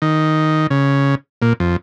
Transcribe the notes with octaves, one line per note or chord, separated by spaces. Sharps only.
D#3
C#3
A#2
F2